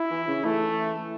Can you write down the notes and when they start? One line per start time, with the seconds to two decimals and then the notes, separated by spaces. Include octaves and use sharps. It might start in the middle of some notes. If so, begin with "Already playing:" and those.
Already playing: E4
0.11 E3
0.28 C#3
0.45 E3 A3